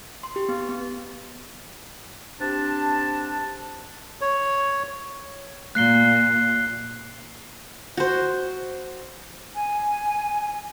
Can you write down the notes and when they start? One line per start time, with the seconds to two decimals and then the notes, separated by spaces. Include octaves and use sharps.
0.23 C6
0.36 G4
0.49 B3
0.69 B3
2.41 C4 D4 G4 A5
4.21 C#5
5.75 A#2 A#3 F#6 C7 G7
7.97 F#4 C5
9.55 G#5